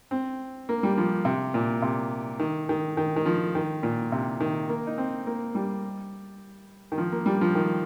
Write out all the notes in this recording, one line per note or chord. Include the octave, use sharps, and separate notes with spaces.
C4
A#3
G3
F3
C3
A#2
C3
D#3
D#3
D#3
D#3
F3
D#3
A#2
C3
D#3
A#3
D#4
C4
A#3
G3
D#3
F3
A#3
G3
F3
D#3